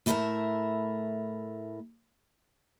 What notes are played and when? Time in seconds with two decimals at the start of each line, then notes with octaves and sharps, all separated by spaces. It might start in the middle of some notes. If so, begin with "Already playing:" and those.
0.06 A2 A3 E4 A4 A#4 E5